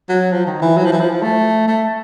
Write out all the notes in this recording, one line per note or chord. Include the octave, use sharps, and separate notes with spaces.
F#3
F3
D#3
E3
F#3
F3
E3
F3
A3
A3